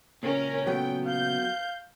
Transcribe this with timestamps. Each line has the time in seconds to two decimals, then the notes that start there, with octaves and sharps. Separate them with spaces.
0.23 A#2 C#3 C#4 A#4
0.67 F#3 A3 B3 G5
1.06 F5 G6